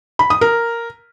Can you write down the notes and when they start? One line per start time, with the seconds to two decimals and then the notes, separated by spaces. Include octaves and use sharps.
0.19 B5
0.30 D#6
0.41 A#4